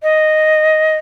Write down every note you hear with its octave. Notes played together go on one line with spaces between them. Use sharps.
D#5